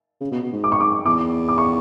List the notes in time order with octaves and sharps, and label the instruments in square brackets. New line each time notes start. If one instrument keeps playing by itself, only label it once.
[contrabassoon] C#3
B2
B2
G#2
[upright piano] D6
C#6
D6
[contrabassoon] E2 [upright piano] D6
[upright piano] D6
C#6